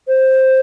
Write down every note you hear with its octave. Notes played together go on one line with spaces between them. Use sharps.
C5